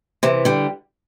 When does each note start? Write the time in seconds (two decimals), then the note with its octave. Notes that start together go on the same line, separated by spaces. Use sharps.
0.23 C3 E3
0.45 D3 G3